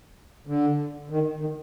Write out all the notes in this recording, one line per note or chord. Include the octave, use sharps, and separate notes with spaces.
D3
D#3
D#3